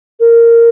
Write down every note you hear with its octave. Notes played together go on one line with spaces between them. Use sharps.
A#4